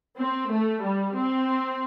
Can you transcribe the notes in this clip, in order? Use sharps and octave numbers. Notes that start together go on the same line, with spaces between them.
C4
A3
G3
C4